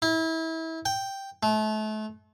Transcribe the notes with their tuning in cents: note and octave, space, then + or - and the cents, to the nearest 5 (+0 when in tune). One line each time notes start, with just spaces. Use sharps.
E4 -30
G5 +0
A3 -35